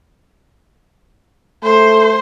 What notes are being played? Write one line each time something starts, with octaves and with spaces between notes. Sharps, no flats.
A3 C5